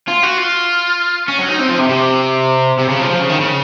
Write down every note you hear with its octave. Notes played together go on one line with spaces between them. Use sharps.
F4
F#4
F4
C#4
F#3
D#4
C4
F3
C3
C3
C3
C#3
F3
F3
C#3
D#3
C#3